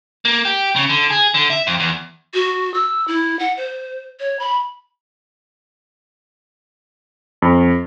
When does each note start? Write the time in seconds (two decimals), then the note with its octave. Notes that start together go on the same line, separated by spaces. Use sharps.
0.25 A#3
0.45 G4
0.76 C#3
0.89 D3
1.10 G#4
1.34 D3
1.50 E5
1.67 F2
1.80 E2
2.34 F#4
2.74 E6
3.08 E4
3.39 F#5
3.57 C5
4.20 C#5
4.39 B5
7.42 F2